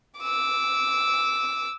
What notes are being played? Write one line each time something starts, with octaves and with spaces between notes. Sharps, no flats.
D6 E6